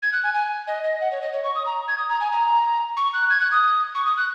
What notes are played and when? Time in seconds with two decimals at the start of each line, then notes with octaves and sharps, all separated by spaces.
0.03 G#6
0.13 F#6
0.24 G#5
0.34 G#5
0.67 D#5
0.84 D#5
1.01 F#5
1.11 C#5
1.22 D#5
1.33 C#5
1.44 C#6
1.55 D#6
1.66 A#5
1.88 G#6
1.98 D#6
2.09 A#5
2.21 G#5
2.32 A#5
2.97 C#6
3.13 F#6
3.30 G#6
3.40 F#6
3.52 D#6
3.95 C#6
4.06 D#6
4.17 F#6